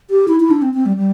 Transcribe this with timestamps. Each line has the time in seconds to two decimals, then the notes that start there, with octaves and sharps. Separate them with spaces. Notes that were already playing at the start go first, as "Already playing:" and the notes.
0.10 G4
0.28 E4
0.40 E4
0.51 D4
0.62 C4
0.74 C4
0.86 G3
0.97 G3